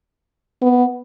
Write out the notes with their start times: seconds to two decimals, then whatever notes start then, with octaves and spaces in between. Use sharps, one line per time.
0.62 B3